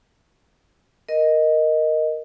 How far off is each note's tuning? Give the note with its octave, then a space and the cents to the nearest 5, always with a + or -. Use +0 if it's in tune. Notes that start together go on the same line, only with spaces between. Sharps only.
A#4 +0 D#5 +0